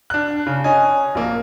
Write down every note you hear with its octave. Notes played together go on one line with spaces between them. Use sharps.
D4 F#6
C#3
C#4 D#5 G#5
A#1 A#3